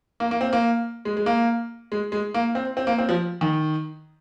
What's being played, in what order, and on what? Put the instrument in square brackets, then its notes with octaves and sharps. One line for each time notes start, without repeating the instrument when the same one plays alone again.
[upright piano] A#3
A#3
C4
A#3
G#3
G#3
A#3
G#3
G#3
A#3
C4
C4
A#3
C4
F3
D#3